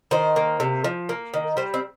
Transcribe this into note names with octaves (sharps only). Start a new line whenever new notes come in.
D#3 C5
A#3
C3
F3
A#3
D#3
G3 C5
C4